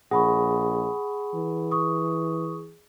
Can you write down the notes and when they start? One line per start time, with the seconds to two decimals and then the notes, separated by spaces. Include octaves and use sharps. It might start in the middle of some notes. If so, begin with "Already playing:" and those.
0.11 A#1 G#4 F#5 B5 C#6
1.34 E3
1.71 C#6 D#6